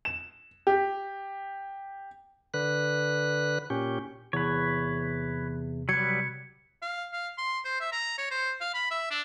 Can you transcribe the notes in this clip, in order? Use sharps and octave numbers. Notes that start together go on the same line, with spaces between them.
E7
G4
D3 B4 F#6
A#2 C#4 G4
E2 C3 B4 C#5
F#3 G3 B4 G#6 C#7
F5
F5
C6
C5
E5
A#5
C#5
C5
F5
B5
E5
D4